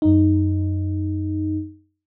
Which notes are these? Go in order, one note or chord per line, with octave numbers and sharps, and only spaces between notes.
F#2 D#4